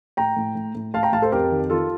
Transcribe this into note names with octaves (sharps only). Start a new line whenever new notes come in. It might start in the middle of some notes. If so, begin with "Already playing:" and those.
A2 G5 A#5
A2
A2
A2
A2 F5 A5
G5 A#5
A2 F5 A5
A4 C5
F2 G4 A#4
D#3
D#3 F4 A4